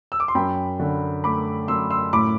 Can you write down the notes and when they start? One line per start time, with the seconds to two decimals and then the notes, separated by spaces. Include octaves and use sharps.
0.12 E6
0.20 D6
0.28 C6
0.35 F#2 G5 B5
0.79 D3
1.24 A3 B5 D6
1.68 F#2 C6 E6
1.90 C6 E6
2.13 A2 B5 D6